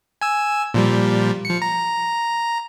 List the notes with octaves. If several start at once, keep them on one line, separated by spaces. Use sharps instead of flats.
G#5 E6
A#2 F3 G3
F3 C#7
A#5